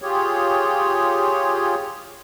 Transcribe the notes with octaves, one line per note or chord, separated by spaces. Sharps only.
F4 G4 G#4 C#5